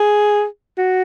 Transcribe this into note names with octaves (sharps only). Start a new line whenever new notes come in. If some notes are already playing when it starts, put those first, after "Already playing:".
Already playing: G#4
F#4